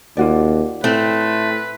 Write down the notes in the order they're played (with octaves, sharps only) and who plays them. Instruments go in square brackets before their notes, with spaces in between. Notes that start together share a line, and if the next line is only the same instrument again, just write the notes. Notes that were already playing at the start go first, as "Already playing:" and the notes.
[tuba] D#2 [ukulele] F4 F#4 D5
[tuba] A2 [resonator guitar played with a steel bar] A3 C4 [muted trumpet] B4